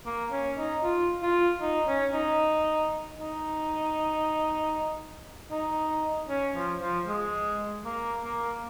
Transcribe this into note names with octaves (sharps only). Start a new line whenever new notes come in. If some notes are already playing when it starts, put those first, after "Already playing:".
A#3
C#4
D#4
F4
F4
D#4
C#4
D#4
D#4
D#4
C#4
F3
F3
G#3
A#3
A#3